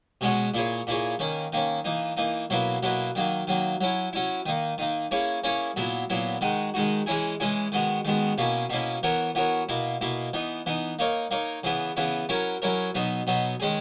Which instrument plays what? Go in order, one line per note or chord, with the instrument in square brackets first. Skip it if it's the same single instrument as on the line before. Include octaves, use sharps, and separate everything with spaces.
[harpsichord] B2 G#3 C#4 F#4 C#5
A#2 A#3 E4 G#4 C#5
A#2 A#3 E4 G#4 C#5
D#3 A#3 C#4
D#3 A#3 C#4
E3 A#3 D#4
E3 A#3 D#4
B2 F#3 A#3 E4 B4
B2 F#3 A#3 E4 B4
D#3 F#3 A#3
D#3 F#3 A#3
F#3 C#4 E4
F#3 C#4 E4
D#3 A#3 D#4
D#3 A#3 D#4
A#3 C#4 E4 G#4 C#5
A#3 C#4 E4 G#4 C#5
A#2 F#3 B3 E4
A#2 F#3 B3 E4
D#3 G#3 D#4 F#4
D#3 G#3 D#4 F#4
E3 G#3 C#4 E4 G#4
E3 G#3 C#4 E4 G#4
D#3 G#3 B3 F#4
D#3 G#3 B3 F#4
B2 A#3 C#4 E4
B2 A#3 C#4 E4
E3 B3 F#4 A#4 C#5
E3 B3 F#4 A#4 C#5
B2 A#3 E4
B2 A#3 E4
E3 B3 D#4
E3 B3 D#4
A#3 D#4 A#4 C#5
A#3 D#4 A#4 C#5
C#3 E3 B3 E4 B4
C#3 E3 B3 E4 B4
F#3 C#4 E4 A#4 C#5
F#3 C#4 E4 A#4 C#5
B2 F#3 B3 D#4
B2 F#3 B3 D#4
D#3 G#3 C#4 G#4